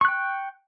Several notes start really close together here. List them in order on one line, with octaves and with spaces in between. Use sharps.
C#6 F#6 G5